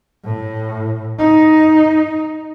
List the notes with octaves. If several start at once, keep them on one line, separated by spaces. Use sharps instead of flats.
A2
D#4